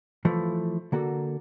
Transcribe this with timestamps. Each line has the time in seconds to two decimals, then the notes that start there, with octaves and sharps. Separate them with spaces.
0.25 E3 F3 A3
0.92 D3 A#3 F#4 A4